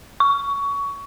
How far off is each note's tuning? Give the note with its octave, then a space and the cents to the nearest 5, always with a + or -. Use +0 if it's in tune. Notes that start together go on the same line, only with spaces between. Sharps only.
C#6 +20